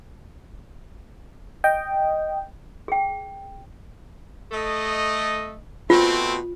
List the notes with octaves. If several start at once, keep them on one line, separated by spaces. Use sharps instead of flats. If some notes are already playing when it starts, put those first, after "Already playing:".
D#5 G5
G#4 G5
A3 D#5
B2 A3 C4 F4